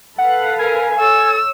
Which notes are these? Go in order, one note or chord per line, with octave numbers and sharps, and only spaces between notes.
A4 B4 F5 F#5
A#4 G#5
A4 C#5 E6